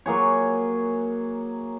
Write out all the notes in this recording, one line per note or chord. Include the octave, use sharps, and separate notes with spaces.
F#3 A#3 G#4 C#5